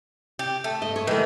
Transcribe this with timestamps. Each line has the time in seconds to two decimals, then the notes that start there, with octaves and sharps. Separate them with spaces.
0.39 G4
0.64 A3
0.82 D#5
0.96 C#5
1.07 D#3 E3 A3